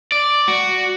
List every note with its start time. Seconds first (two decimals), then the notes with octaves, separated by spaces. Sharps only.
0.12 D5
0.48 F#4